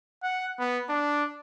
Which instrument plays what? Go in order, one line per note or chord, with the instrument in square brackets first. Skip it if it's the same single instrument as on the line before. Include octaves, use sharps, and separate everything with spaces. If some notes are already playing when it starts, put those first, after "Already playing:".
[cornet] F#5
B3
D4